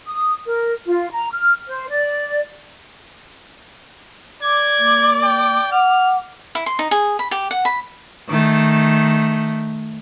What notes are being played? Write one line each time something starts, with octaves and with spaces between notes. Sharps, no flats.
D#6
A#4
F4
A#5
F6
C5
D5
D5 D6 G#6
A#3
G5
F#5 F6
E4
C6
D#4
G#4
B5
G4
F#5
B5
D#3 A3